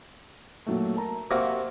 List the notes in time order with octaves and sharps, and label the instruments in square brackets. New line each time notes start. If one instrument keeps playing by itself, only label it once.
[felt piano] A#2 F#3 A3
A#4 A5 A#5
[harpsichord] C3 A#3 F#4 [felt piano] F5